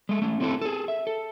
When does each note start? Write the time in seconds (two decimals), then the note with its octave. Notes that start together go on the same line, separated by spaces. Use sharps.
0.09 G#3 A3
0.22 A3 C#4
0.40 A3 C4 C#4 E4 F#4 A4
0.62 G#4 A4
0.88 E5
1.07 A4